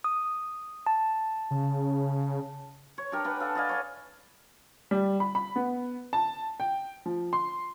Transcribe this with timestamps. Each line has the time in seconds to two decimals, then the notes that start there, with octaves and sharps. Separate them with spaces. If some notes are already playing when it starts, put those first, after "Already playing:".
0.04 D#6
0.87 A5
1.51 C#3
2.98 C#5
3.12 D4 G4 A#4
3.24 D4 B4 F#5 G#5
3.40 A4 F5
3.55 D5 D#5 F5 G#5
3.69 C#5 A5
4.91 G3
5.20 B5
5.35 B5
5.56 B3
6.13 A5
6.60 G5
7.06 F3
7.33 C6